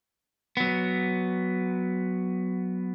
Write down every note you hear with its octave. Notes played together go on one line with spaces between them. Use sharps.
F#3 B3